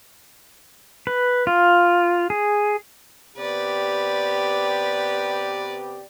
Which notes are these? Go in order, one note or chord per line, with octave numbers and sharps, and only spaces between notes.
B4
F4
G#4
C3 B3 G4 B4 D5